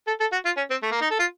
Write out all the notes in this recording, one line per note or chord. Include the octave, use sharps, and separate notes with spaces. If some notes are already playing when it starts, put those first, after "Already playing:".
A4
A4
F#4
F4
C#4
C4
A3
A#3
D#4
A4
F4